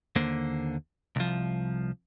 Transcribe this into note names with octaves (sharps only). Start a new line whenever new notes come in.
D#2 D3 A#3 C5
C2 F3